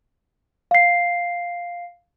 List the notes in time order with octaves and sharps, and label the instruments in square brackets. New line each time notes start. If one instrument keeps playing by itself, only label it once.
[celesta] F5 C7